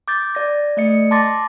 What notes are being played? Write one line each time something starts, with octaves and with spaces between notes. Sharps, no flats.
D6 G6 A6
D5 A#6
A3 D5 D#5 C#7
A5 C6 D6 A6 A#6